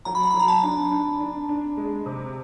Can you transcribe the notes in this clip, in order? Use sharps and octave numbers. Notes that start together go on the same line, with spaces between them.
F#3 A#5
B5
A#5
B5
F#3
A#5
A5
D4
D4
D4
D4
G#3
C3